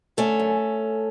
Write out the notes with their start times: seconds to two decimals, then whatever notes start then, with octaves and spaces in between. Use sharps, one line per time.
0.17 D3 A3 C#4
0.40 F#2